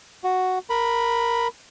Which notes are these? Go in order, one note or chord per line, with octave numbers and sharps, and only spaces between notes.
F#4
A#4 B5